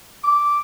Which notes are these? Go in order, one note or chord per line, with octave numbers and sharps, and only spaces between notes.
D6